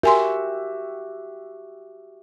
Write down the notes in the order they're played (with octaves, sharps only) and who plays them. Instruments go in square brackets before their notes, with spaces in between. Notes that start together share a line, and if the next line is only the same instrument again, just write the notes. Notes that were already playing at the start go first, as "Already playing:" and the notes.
[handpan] F#4 G4 E5 [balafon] A#4 G#5 C6